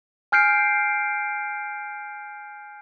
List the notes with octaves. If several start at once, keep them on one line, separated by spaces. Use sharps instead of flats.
G#5 F6 G6 C7 D7